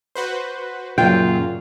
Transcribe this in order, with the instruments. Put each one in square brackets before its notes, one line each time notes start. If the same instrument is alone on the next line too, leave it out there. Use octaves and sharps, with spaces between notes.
[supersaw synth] F#4 B4 C5
[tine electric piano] F#2 A#2 C#3 [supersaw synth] F#3 [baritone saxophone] F4 [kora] G5